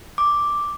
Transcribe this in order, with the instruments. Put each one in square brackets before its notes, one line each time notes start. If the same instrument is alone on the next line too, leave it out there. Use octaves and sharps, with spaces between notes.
[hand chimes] D6